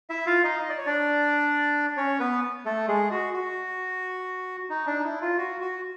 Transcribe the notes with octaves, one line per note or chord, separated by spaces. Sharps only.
E4 E5
F4 F5
D#4 D#5
D#5
D5
C#5
D4 D5
C#4 C#5
B3 B4
A3 A4
G#3 G#4
F#4
F#4
D#4
D4
D#4
E4
F4
F#4
F#4